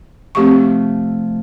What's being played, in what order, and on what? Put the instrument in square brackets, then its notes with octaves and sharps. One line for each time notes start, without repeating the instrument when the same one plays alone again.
[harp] C3 F3 A3 [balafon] C4 G4 C#6